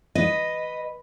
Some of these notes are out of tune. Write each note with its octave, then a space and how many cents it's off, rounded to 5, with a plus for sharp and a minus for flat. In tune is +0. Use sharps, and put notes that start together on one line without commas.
B4 +0 D#5 +0